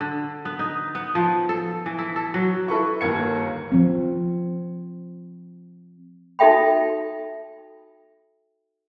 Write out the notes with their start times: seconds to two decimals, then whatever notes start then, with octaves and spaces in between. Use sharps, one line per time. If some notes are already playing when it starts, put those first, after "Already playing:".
0.01 D3
0.45 B3
0.59 D#4
0.95 B3
1.15 F3
1.49 A4
1.86 E3
1.99 E4
2.16 A4
2.34 F#3
2.68 E4 A4 B4 C#6
3.01 G1 D#2 A#3 G#6 C#7
3.72 F3 C4
6.39 D#4 F#4 A4 E5 G5 B5